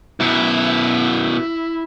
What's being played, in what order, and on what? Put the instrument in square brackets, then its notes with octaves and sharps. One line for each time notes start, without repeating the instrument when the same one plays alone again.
[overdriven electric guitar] F#2 B2 [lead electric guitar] E4